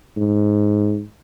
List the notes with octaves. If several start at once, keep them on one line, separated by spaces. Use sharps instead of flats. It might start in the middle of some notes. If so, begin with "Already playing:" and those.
G#2